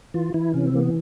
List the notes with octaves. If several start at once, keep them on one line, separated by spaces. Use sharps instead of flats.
E3 F4
E3 E4
C3 C#4
C4
E3 A#3
B3